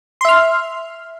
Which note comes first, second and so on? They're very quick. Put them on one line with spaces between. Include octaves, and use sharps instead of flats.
C6 E5 F6